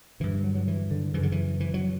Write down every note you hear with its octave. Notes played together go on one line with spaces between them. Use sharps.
G2 D3 E3
F#3
F#3
E3
D3
F#2 C#3 E3
D3
E3
E3
F#3